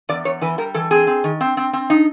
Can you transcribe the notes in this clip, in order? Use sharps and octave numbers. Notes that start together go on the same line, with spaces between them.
E2 D5
E2 C#5
E3 B4
G3 A#4
E3 A4
C4 G#4
C4
D#3
C4
C4
C4
D#4